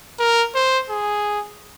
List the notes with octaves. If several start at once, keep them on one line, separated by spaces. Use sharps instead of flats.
A#4
C5
G#4